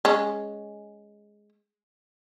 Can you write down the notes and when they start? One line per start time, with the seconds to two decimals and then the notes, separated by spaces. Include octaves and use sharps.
0.05 G#3 C#4